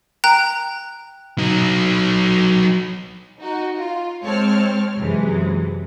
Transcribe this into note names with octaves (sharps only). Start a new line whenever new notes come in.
G5 A#5 F#6
F#3 D#4
D#4 F#4
F4
G#3 C4 C#5 A5 F6
F#2 C3 E3 G#3